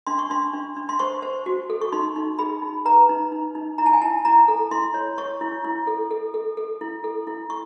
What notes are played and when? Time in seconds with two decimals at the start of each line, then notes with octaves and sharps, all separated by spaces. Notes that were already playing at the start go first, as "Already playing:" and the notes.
0.07 D4 C6
0.19 C#6
0.30 D4 C6
0.53 D4
0.76 D4
0.89 C6
0.99 C5 C#6
1.22 C5
1.46 F#4
1.70 A4
1.81 C#6
1.92 D#4 C6
2.16 D#4
2.39 G#4 B5
2.62 D#4
2.85 B4 A#5
3.09 D#4
3.32 D#4
3.55 D#4
3.78 E4 A#5
3.86 A5
3.94 G#5
4.02 E4 A5
4.25 E4 A#5
4.48 A4
4.71 E4 C6
4.94 C#5
5.18 C#5 C#6
5.41 E4
5.64 E4
5.87 A4
6.11 A4
6.34 A4
6.57 A4
6.81 E4
7.04 A4
7.27 E4
7.50 C#6